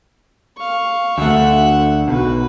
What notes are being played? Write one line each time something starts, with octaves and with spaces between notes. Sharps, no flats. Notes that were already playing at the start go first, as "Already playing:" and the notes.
F5 C#6
D2 A3 E5 F#5
B1 F#4 B4